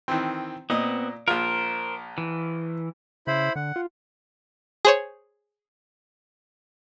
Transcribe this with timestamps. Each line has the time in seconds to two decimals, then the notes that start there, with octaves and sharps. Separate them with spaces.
0.08 D#3 E3 C4
0.70 A#2 B3 C4 D#5
1.28 A#1 F4 A#4 C5
2.18 E3
3.27 C#3 E4 C5 B5
3.56 D3 F#5
3.76 F4
4.85 G#4 C5 C#5